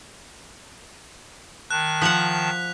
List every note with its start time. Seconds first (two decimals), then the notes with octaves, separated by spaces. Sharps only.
1.71 D#3 A5 F#6
2.02 F3 F#5 B6 F7